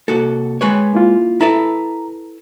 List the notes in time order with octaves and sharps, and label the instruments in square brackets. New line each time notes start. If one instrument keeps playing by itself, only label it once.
[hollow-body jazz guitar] C2 F#4 A4 [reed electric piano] A#3
[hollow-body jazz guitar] G#3 B4 C#5
[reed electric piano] A#3 E4 F4
[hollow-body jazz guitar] E4 A4 B4 [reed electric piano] A#5